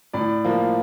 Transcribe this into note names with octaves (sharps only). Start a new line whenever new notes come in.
A2 D5
F3 A#3